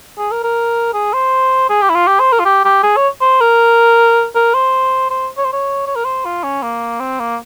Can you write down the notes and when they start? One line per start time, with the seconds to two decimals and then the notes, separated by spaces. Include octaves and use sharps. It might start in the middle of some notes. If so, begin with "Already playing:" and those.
0.18 G#4
0.31 A#4
0.44 A#4
0.94 G#4
1.13 C5
1.70 G#4
1.82 G4
1.90 E4
1.95 F4
2.07 G4
2.20 C5
2.33 A#4
2.40 F4
2.45 G4
2.65 G4
2.83 G#4
2.97 C#5
3.21 C5
3.41 A#4
4.35 A#4
4.54 C5
5.10 C5
5.37 C#5
5.45 C5
5.53 C#5
5.87 C#5
5.96 A#4
6.05 C5
6.25 F4
6.43 C#4
6.63 A#3
7.00 C4
7.20 A#3